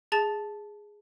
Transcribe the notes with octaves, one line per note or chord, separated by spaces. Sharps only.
G#4 A5 A6